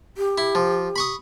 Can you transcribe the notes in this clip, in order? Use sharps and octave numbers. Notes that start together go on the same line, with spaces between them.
G4
E4
F3
B5 C#6 D#6